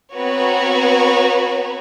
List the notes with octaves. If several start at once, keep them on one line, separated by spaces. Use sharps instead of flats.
B3 C4 F#4 B4 C#5 A#5